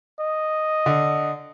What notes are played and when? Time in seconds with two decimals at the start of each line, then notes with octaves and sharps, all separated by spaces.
0.20 D#5
0.86 D3